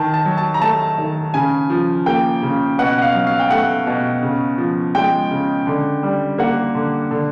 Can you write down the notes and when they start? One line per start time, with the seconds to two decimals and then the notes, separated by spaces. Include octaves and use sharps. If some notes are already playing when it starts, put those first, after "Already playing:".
Already playing: D#3 A5
0.14 A5
0.25 F#3
0.38 A5
0.54 A#5
0.61 A3 A5
0.98 D#3
1.34 C#3 G#5
1.70 F3
2.06 A#3 G5
2.42 C#3
2.79 B2 F#5
2.98 F#5
3.02 F5
3.14 F#3
3.27 F5
3.40 G5
3.50 A3 F#5
3.87 B2
4.23 C#3
4.58 F3
4.95 G#3 G5
5.31 C#3
5.67 D3
6.03 G3
6.39 A#3 F#5
6.75 D3
7.11 D3